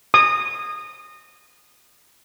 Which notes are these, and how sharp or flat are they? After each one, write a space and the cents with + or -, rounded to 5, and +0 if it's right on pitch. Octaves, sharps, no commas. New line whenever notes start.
D#6 -20